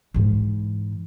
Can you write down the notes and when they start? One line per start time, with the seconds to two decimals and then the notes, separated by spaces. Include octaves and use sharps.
0.14 G#2 E3